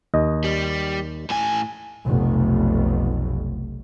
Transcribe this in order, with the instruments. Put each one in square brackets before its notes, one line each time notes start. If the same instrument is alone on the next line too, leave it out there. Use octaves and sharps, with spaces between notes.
[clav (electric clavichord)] D#2 D#5
[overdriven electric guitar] G3
A2 G#5
[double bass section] F1 B1